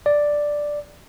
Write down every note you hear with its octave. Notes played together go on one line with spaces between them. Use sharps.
D5